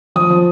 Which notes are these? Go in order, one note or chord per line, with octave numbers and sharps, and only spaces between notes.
F3 D#6
F3